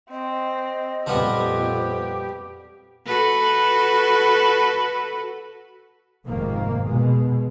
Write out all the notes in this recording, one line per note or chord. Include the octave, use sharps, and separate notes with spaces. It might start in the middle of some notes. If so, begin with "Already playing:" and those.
C4 D#5
F2 A#2 F3 G3 B3 G4
F#4 A4 B4
F1 G#2 D#3 A#3
B2 G#3